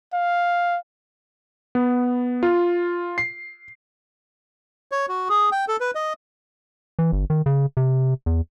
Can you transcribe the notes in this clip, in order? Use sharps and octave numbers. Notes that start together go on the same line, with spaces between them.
F5
B3
F4
C7
C#5
F#4
G#4
G5
A4
B4
D#5
E3
G1
D#3
C#3
C3
E2